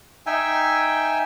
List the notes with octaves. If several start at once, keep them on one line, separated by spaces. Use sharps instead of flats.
D#4 E5 G5 G#5